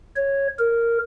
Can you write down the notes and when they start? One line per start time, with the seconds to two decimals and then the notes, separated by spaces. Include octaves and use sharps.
0.16 C#5
0.59 A#4